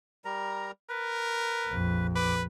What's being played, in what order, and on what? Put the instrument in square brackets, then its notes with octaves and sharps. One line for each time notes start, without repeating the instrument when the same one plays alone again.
[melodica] G3 A#4 A#5
[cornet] A#4 [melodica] B4
[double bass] A#1 F2
[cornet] B4 [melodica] D6